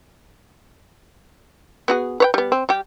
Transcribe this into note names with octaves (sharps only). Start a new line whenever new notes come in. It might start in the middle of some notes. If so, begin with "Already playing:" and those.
B3 F#4 G#4
B4 C#5 G5
G3 B3
C4
G3 G4